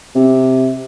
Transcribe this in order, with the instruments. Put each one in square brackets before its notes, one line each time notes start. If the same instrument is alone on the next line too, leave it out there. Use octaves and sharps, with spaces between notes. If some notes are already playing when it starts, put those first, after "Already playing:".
[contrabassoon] C3